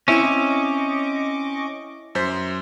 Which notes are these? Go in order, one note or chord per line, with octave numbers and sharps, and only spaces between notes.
C4 C#4 E4 D#5 C#6 D6 E7
F#2 C5 B6